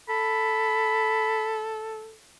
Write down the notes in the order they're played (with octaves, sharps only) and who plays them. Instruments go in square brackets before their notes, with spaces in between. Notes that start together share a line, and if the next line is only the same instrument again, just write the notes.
[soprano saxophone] A4 [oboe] B5